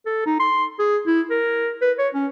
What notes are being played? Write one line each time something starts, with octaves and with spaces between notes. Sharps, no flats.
A4
D#4
C6
G#4
E4
A#4
B4
C#5
C#4